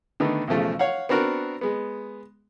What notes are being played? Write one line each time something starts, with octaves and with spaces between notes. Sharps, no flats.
D3 D#3 A3 B3 D#4
B1 E2 C#3 F3 A3
C#5 F5 F#5
B3 C4 D4 F#4 A#4
G#3 B3